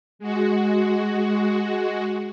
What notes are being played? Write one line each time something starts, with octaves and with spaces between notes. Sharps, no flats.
G#3 F#4